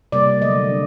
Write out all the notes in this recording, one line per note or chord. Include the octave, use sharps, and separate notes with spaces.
C3 G3 A#3 D5
D3 F#3 A3 D#5
D4